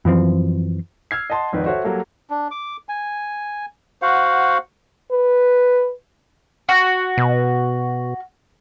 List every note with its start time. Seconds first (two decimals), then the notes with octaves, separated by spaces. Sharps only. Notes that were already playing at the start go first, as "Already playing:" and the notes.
0.05 F#2 E3 F3 C4
1.11 E6 F6 G#6 C7
1.30 D#5 F#5 A5 C6
1.52 G#1 F2 D#3 B4
1.66 F#4 A4 C5 C#5 E5
1.84 F#3 G3 A#3 A4
2.30 D4
2.51 D6
2.89 G#5
4.02 F#4 C5 F5 F#5
5.12 B4
6.69 F#4
7.18 B2